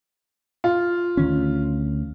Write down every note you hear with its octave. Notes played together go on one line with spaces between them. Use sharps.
F4
D2 D#3 C#4